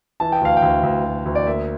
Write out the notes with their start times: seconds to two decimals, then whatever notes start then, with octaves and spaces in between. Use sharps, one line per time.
0.20 E3 A5
0.32 G5
0.41 D2 F5
0.57 G5
0.62 D2
0.83 D2
1.05 D2
1.26 D2
1.35 D5
1.46 A#3 E5